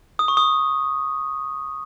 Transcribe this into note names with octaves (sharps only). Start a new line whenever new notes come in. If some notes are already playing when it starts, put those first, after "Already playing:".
D#6
C#6
D#6